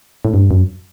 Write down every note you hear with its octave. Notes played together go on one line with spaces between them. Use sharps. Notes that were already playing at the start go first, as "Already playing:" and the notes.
A2
G2
F#2